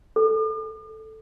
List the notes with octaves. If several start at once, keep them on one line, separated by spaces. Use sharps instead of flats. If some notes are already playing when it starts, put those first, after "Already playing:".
A4